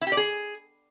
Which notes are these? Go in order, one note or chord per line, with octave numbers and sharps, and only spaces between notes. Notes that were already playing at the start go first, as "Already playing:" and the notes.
E4
G4
D5
G#4